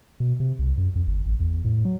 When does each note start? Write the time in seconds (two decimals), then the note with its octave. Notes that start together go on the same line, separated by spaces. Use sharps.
0.20 B2
0.40 C3
0.59 C2
0.78 F#2
0.96 F2
1.07 G1
1.26 A1
1.40 E2
1.64 A2
1.85 F#3